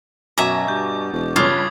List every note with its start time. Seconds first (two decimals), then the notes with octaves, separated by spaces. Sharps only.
0.38 F#2 B2 E5 G#5 A#5 D6
0.68 G2 G6
1.13 E1
1.36 G2 C#3 C#4 F4 D6 D#6 G#6